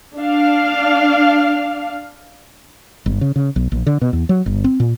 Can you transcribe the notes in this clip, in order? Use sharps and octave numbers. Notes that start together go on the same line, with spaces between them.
D4 F5
G1
C#3
C#3
B1
A#1
D3
B2
E2
F#3
G1
C4
A#2